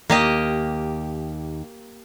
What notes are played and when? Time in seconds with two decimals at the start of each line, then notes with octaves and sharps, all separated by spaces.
0.10 D#2 A#3 G4 D#5